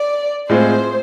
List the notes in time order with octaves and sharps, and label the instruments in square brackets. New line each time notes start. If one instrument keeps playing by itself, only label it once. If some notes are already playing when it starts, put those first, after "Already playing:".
Already playing: [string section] D5
[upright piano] A2 G#3 C4 F4 G#4 [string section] C5